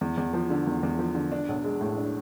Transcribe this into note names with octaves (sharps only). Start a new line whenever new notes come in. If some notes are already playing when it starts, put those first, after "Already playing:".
E2
E2
F3
D3
E2
E2
F3
D3
D4
B1
G#3
A2
D4